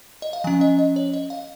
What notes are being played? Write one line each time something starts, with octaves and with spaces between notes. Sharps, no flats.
D#5
F5
F3 C#4 G#5
D#5
D#5
C#5
D#5
F5